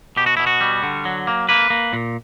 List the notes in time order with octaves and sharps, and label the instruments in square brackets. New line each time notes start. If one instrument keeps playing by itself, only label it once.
[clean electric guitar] B2 G4
F#4
B2 E4
F#4
G3
D3
F#3
A#3
A#3 B4
A#3
A#2